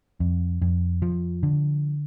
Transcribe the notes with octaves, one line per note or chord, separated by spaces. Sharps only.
F2
F2
F3
D3